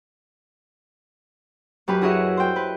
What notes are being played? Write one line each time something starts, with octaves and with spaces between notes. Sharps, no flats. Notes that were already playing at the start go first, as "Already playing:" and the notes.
F#2 G4 B4
E4 F#4 G#4 C#5 D#5 E5
C5 G5
B4